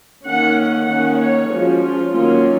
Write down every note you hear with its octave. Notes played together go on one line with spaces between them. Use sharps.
D#3 A#3 C#4 F#5
F#5
D#3 A#3 C#4
C#5
F3 G#3 C#4 F#4
F4
D#3 F#3 A#3 C#4 F4